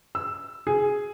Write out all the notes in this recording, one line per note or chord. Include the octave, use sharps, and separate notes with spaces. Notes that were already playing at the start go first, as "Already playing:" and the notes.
E6
G#4